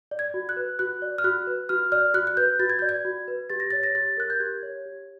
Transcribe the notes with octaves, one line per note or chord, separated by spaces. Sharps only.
D5
G#6
F#4
F#6
B4
F#4 F#6
D5
F6
F#4 F#6
B4
F#4 F6
D5 F6
F#4 F#6
F#6
B4 G6
F#4 A6
G#6
D5 G6
G#6
F#4
B4
G4 A6
A#6
C#5 A6
A#6
G4 A6
A#4 F#6
G6
G4 G#6
C#5
G4